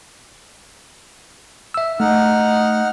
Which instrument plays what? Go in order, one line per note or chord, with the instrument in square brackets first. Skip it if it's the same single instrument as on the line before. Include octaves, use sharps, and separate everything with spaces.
[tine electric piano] E5 E6
[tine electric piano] A3 [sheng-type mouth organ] D#4 F#5 F6